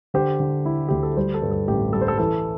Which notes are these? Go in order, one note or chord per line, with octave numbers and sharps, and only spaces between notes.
D3 G4 C5
D3
E4
D2 G4
A4
G3 G4 C5
A4
G2
A4
A1 G4
G3 A4
C5
A4
E3 A4